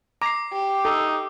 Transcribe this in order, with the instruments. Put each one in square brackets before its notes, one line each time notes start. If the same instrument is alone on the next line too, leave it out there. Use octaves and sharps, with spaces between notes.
[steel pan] A#5 [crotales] D6 C7
[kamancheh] G4
[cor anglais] D#4 [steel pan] A4